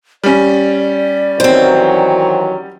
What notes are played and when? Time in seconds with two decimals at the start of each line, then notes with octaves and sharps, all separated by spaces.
0.24 G3 C#4 D5
1.40 D#3 E3 F#3 C4 C5